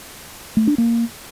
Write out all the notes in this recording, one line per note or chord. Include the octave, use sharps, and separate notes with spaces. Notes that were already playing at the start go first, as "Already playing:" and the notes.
A3
D4
A#3